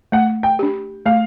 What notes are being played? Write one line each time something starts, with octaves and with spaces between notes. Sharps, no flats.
A3 F#5
G5
D4 G4
A3 F5